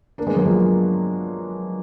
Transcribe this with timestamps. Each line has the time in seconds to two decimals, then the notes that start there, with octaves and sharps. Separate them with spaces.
0.18 A#3 D4
0.27 G#3 B3
0.36 F#3 A#3
0.45 F3 G#3